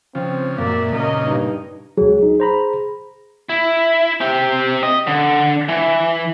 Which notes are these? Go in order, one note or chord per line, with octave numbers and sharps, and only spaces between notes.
C#3 F3 C4
F#2 A#2 A#3 D5 E5
A#2 C#3 A#4 D#5
G2 D#4
C#2 F#3 G#4
D#4
C5 A#5 B5
E4
C4 G4
D#5
D3
E3